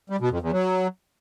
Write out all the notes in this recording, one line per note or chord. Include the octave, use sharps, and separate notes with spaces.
G3
B2
F2
E2
F#3